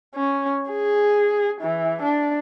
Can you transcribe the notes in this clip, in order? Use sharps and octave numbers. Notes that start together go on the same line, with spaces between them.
C#4
G#4
E3
D4